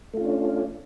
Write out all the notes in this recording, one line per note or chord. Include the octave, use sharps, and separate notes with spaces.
A3 C#4 D4 F4